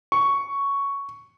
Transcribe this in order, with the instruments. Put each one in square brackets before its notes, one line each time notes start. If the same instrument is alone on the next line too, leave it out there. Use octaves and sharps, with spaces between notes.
[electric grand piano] C#6